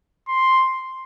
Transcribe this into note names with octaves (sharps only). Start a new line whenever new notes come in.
C6